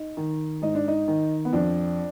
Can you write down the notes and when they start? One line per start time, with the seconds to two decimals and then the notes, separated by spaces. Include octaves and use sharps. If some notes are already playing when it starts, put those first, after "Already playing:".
Already playing: D#4
0.17 D#3
0.62 G#2 D#4
0.75 D4
0.88 D#4
1.08 D#3
1.45 B3
1.53 F2 D4